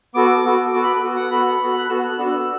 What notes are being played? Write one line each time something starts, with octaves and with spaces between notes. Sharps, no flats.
B3 F#4 A4 D6
B3 F#4 A4
B3 F#4 A4 D6
B5
B4
B3 F#4 A4
F#5
B3 F#4 A4 B5
B3 F#4 A4
F#6
B3 F#4 A4 E6
F#6
B3 D4 F#4 A4 E6